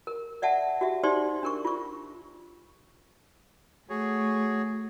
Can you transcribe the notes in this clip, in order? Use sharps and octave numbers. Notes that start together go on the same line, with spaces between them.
A#4
D5 E5 F#5 A5
F#4 G4 E5
D#4 G4 C5 D5 C6
D4 A#4 C#6
F4 C#6
A3 F#4 G#4 C#5